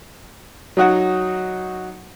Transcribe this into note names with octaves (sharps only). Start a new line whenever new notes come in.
F#3 D#4 F#4 F#5